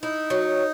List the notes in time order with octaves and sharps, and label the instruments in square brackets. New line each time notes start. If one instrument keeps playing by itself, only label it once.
[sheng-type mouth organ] D#4 [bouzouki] E4
[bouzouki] F#3